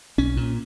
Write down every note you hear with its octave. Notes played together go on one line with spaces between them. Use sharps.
B1 C#4
A#2